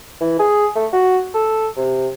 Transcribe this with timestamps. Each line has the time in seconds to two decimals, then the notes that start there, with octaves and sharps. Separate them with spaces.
0.21 E3
0.39 G#4
0.76 A3
0.93 F#4
1.34 A4
1.77 C3